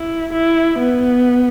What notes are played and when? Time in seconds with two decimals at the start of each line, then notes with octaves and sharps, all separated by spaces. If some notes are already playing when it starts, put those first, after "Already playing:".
Already playing: E4
0.33 E4
0.79 B3